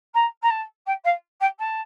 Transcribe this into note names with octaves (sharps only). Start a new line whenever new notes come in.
A#5
A#5
A5
G5
F5
G5
A5